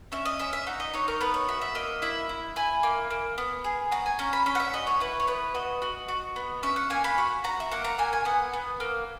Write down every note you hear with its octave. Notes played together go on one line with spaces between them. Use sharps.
C#4 E5
D#5
C#4 E5
E5
D#4 F#5
D#5
D#4 C#5
A#4
B3 B4
C#5
F#4 E5
E5
A#3 D#5
E4 E5
E4
E4 G#5
A#3
A#3
B3
G#4
F#4 A#5
G#5
C#4 A#5
B5
C#4 B5
F#5
E5
F#4 D#5
C#5
E4 B4
C#5
B3 B4
F#4 D#5
F#4
F#4
B3
C#4 E5
F#5
A#3 G#5
B5
F#4
F#4 A#5
E5
A#3 F#5
A#5
A#3 G#5
G#5
B3 F#5
B3
A#3